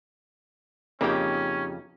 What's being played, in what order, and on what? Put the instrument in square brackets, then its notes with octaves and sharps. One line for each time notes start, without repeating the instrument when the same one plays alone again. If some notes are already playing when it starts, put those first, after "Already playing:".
[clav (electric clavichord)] F2 C#3 [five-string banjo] A#3 D#4 G4 [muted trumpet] C#4